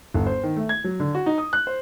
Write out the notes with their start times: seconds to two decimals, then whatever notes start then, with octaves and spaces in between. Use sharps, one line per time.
0.14 G1
0.27 C5
0.43 D#3
0.56 A3
0.69 G#6
0.84 F#3
1.00 D3
1.15 F#4
1.26 D#4
1.38 D#6
1.53 F#6
1.67 C5